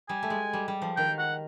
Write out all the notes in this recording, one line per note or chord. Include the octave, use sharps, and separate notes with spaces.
G3 G#5
A3
G#3
G3
G3
F3
D#3 G5
F#5